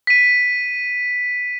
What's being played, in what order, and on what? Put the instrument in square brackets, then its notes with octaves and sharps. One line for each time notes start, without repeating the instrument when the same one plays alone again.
[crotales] B6 D#7